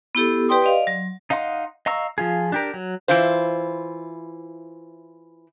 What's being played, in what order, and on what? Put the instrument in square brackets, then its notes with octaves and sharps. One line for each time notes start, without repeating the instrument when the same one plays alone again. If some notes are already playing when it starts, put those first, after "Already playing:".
[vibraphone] B3 E4 G4 A4
G4 B4 D5 G5 C6 D#6
D5 D#5 F5
F#3
[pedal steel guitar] D#4 D#5 F5 F#5 C6
D#5 F5 A#5 C#6 E6
F3 F4 G#4
D4 G4 A#4
F#3
[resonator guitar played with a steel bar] E3 E4 F4 C5